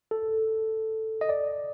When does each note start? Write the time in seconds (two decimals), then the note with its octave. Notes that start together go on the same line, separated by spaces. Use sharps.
0.11 A4
1.21 D#5
1.29 D5